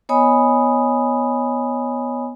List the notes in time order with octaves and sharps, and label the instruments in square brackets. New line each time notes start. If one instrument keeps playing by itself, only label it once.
[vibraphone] B3 C#5 D#5 G#5 B5 D#6